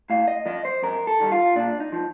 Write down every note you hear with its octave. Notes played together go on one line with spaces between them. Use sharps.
A2 F5
D#5
F3 D#5
C5
F2 A#4
A4
D#3 G3
F4
A#2 D4
D#4
F3